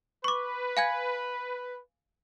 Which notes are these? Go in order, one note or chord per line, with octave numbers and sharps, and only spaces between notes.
B4 C#6 D6
F5 G#5 G#6